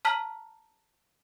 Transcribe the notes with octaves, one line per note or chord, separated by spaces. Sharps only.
A5 A#5 F6 B6 F#7